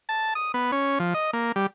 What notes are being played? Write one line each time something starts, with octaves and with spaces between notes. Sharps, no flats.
A5
D#6
B3
C#4
F3
D#5
A#3
G3